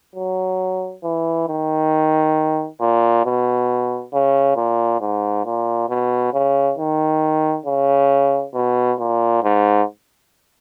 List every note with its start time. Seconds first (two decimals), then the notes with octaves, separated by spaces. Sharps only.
0.15 F#3
1.03 E3
1.48 D#3
2.80 A#2
3.25 B2
4.13 C#3
4.56 A#2
5.00 G#2
5.45 A#2
5.89 B2
6.33 C#3
6.78 D#3
7.66 C#3
8.54 B2
8.99 A#2
9.43 G#2